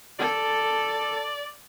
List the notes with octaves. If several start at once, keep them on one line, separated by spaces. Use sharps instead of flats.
A4 D5